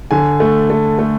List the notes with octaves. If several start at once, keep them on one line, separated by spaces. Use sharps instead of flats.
D3 G#5
A3
A3
A3